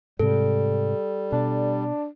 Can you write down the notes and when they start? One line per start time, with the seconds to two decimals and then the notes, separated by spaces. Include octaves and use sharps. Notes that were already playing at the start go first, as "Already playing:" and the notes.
0.19 G#2 C3 G3 A4
1.32 B2 D4